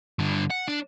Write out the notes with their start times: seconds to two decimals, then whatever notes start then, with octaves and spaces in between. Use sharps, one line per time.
0.19 G2 D3
0.50 F#5
0.68 D4